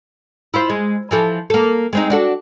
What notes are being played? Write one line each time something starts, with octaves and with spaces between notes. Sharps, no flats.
E4 F4 C5
G#3
E3 F3 A4
A#3 A4
G#3 C4 D#4
D4 F#4 A4